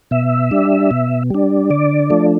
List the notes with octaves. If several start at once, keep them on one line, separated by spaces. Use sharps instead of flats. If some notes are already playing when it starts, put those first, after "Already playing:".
B2 E5
G3 D4
B2
G3 D4
D3 D5
F3 A3 D4